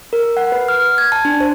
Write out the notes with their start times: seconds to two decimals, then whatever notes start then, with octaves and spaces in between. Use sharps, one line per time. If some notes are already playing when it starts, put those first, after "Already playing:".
0.13 A#4
0.37 F#5
0.52 B4
0.68 F6
0.98 G#6
1.12 A5
1.25 D4
1.40 C5